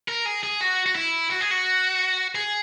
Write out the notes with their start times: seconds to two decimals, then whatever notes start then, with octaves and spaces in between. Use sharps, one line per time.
0.09 A#4
0.26 G#4
0.44 G#4
0.61 F#4
0.86 F#4
0.95 E4
1.31 F#4
1.41 G#4
1.51 F#4
2.35 G#4